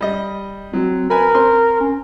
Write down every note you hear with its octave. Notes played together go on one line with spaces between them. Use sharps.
G3 D#5
F#3 C4
A#4 B4 G#5 B5
C4 C6
C#4